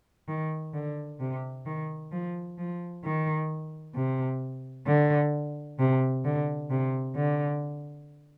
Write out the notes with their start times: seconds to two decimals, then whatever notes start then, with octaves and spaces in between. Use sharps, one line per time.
0.28 D#3
0.74 D3
1.20 C3
1.66 D#3
2.12 F3
2.58 F3
3.04 D#3
3.95 C3
4.87 D3
5.79 C3
6.25 D3
6.70 C3
7.16 D3